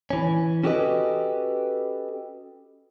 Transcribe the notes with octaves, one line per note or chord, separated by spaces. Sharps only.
E3 C#4
C#4 F#4 G4 A4 B4 D#5